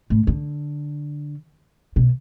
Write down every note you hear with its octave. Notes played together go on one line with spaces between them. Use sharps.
A2
D3
B2